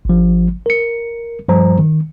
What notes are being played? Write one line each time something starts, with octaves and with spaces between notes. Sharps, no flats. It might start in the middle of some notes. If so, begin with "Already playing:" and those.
G#1 F3
A#4 C#7
G2 F3 G3 C5 A#5
D#3